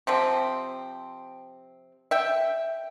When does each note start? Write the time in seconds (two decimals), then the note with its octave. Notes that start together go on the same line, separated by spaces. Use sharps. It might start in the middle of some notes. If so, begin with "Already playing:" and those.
0.07 C3 F3 C4
2.11 E5 G5